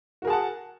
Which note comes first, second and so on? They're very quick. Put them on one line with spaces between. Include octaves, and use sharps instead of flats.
F#4 A#4 G#4 A5 F#5